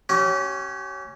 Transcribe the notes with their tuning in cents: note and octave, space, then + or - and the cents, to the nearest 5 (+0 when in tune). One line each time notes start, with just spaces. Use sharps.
C#4 +0 G4 -40